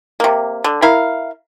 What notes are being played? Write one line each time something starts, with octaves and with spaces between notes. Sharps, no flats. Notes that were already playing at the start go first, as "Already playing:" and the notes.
C3 A#3
D3
E4 A#4 F5